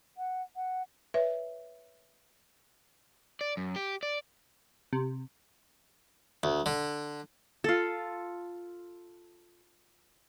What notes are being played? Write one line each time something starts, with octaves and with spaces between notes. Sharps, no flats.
F#5
F#5
B4 C#5 E5
D5
F#2
G4
D5
C3
D2
D3
F4 A4